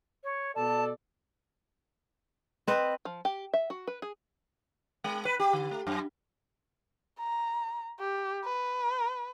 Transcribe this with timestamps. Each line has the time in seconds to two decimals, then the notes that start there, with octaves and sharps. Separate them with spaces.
0.24 C#5
0.55 B2 A4 D5 A5
2.68 C4 B4 D#5
3.05 F3
3.25 G4
3.54 E5
3.70 F#4
3.87 B4
4.02 G#4
5.04 G#3
5.25 B4
5.39 G4
5.53 D3
5.71 A3
5.87 F#2
7.19 A#5
8.00 G4
8.44 B4